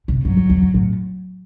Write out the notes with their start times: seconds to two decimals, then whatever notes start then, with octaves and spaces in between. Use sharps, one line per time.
0.08 C3
0.24 G2 F#3
0.37 E2
0.49 E2
0.62 G2
0.74 A2